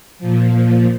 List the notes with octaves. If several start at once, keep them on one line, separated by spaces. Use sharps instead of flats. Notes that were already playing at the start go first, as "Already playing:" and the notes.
A#2 F3